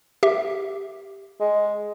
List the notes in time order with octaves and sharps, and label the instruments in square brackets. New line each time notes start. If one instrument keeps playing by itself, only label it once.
[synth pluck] G4 E5
[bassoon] G#3